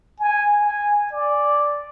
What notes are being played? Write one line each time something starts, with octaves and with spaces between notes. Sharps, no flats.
G#5
G#5
D5